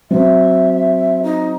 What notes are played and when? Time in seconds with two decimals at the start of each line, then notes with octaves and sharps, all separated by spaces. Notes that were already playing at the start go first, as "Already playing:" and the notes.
0.11 F#3 C4 E5
1.23 D#4